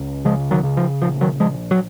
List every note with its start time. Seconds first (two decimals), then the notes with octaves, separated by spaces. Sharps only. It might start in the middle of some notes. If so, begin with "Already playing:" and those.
Already playing: C#2
0.25 C#3 F3 G#3
0.51 D#3 F#3
0.63 C#3
0.77 F3
1.02 A#1 F3
1.21 D#3 F#3
1.40 A#1 F3 G#3
1.71 F#3